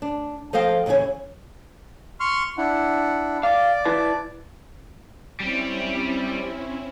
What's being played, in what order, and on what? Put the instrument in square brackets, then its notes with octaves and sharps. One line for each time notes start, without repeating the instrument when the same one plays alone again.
[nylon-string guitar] D4
F3 A4 C5 D#5 F5 G5
D#2 C#3 E3 C#5 G#5
[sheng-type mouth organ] C6 C#6 F6
D4 E4 F#5
[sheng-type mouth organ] D5 D6 [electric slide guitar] F5
[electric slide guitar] E4 B4 A5
[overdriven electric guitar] G3 G4 [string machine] C4 C#4 E4